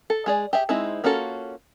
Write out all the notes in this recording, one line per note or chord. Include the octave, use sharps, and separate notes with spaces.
A4
G#3 G#4 D5
G4 G#4 E5
G#3 C4 D#4 E4
A#3 C#4 F4 F#4 A4